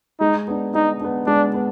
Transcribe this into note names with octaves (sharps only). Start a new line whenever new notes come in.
G#3 D#4
B3 D4
G#3 D#4
B3 D4
G#3 D4
B3